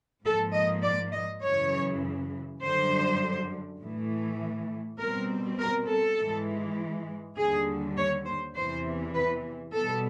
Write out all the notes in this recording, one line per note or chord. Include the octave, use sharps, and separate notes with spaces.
G#2 F3 A#3 A4
D#5
D5
D#5
F#2 C#3 E3 C#5
F#2 D3 G3 C5
A2 E3 A3
B2 G3 C4 A#4
A#4
A4
G#2 E3 G#3
D#2 D3 G3 G#4
C#5
C5
E2 C3 E3 C5
B4
B2 G3 B3 A4